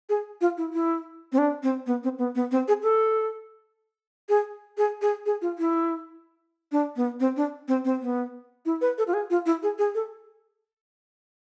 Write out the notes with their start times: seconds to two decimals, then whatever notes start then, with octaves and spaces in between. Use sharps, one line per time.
0.09 G#4
0.41 F4
0.57 E4
0.73 E4
1.32 C4
1.38 D4
1.63 C4
1.86 B3
2.03 C4
2.18 B3
2.35 B3
2.51 C4
2.68 G#4
2.83 A4
4.29 G#4
4.78 G#4
5.01 G#4
5.26 G#4
5.42 F4
5.58 E4
6.72 D4
6.96 B3
7.20 C4
7.37 D4
7.68 C4
7.85 C4
8.01 B3
8.66 E4
8.81 B4
8.98 A4
9.07 F4
9.14 G#4
9.30 F4
9.46 E4
9.63 G#4
9.78 G#4
9.95 A4